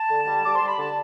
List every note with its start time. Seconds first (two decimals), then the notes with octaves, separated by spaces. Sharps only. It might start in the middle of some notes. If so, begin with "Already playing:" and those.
Already playing: A5
0.10 D3
0.27 G3
0.44 G3 D6
0.55 C6
0.61 G3
0.67 B5
0.78 D3 A5